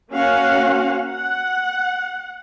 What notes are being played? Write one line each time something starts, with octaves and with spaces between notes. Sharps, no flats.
A#3 C#4 F#4 F5 F#5
F#5